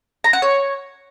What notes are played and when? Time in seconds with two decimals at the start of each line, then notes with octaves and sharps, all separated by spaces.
0.24 A#5
0.33 F#5
0.42 C#5